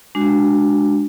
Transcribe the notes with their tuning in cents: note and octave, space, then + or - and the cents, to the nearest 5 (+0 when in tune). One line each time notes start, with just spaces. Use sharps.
G#3 +0 D4 +0 F#4 +0